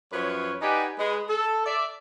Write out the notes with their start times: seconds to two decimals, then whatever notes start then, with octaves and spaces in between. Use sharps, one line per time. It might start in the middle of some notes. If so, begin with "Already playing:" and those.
0.13 F#2 F3 B4 C#5
0.62 D#4 G4 B4 D5 F#5 G#5
0.98 G#3 B4
1.29 A4
1.65 D5 E5